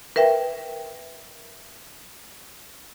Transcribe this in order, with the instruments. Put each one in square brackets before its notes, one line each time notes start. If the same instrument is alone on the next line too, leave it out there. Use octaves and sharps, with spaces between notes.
[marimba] A#4 B4 E5 G5